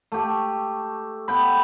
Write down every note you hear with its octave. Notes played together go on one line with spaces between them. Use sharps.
A3 G4
B3 G5 B5